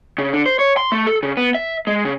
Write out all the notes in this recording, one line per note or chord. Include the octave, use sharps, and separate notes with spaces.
C#3
D3
C5
C#5
C6
A3
A4
C#3
B3
E5
G#3
C#3